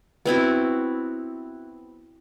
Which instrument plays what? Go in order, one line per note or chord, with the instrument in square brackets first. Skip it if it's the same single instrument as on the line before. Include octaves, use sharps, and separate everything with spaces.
[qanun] B3 C4 E4 F#4